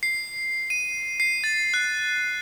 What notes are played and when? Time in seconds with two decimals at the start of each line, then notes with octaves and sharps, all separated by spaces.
0.03 C7
0.70 D#7
1.20 C7
1.44 A6
1.74 F#6